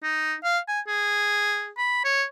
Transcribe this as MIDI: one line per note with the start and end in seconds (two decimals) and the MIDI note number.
0.03 0.35 63
0.44 0.59 77
0.68 0.80 80
0.87 1.70 68
1.78 2.04 83
2.04 2.24 73